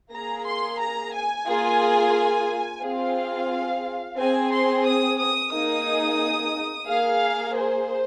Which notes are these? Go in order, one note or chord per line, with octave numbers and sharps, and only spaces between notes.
A#3 G#4 A#5
C6
A#5
G#5
A#3 F4 G#4
C4 F4 G#4 F5
C4 G#4 G#5
C6
D#6
D#6
A#3 D#4 G#4 D#6
A#3 G#4 F5
C5